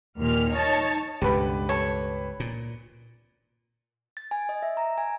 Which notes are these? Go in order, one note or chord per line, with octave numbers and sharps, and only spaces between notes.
D#2 A#2 F6
D#4 C#5 A5
C#2 G2 B2 D3 G4 B4
A4 C#5
A#2
A6
G#5
D#5
E5
A#5
G#5